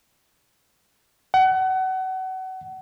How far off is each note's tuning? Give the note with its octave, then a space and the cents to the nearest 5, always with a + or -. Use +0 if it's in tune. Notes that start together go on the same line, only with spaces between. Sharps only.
F#5 +30